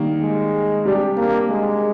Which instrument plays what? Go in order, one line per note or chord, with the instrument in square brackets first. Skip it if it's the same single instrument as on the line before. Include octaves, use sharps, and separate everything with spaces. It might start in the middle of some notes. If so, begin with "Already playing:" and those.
Already playing: [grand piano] D#3 G3 A#3
[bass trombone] G#3
[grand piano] C3 G3 D4 G4
[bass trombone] A#3
G#3